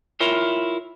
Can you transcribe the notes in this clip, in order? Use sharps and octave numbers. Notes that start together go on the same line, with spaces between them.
E4 F4 A#4 C#5